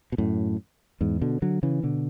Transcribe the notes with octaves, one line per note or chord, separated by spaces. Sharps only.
B2
F#2 A2
E2 G#2
B2 D3
D3 F#3
C#3 E3
B2 D3